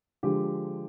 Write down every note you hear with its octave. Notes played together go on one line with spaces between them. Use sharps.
D3 F3 G#3 G4